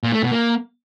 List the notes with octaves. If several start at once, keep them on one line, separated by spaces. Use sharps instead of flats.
A#2
A3
B2
A#3